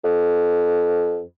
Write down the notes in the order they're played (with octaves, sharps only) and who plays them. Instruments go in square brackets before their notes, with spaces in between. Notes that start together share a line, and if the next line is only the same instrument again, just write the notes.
[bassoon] F2